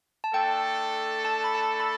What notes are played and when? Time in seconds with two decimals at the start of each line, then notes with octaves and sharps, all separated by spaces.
0.24 A5
0.34 A3 D4 A4 G5
1.25 A5
1.44 B5
1.55 A5
1.80 B5